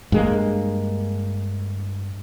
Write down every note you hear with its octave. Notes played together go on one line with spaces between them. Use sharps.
G2 G#3 A#3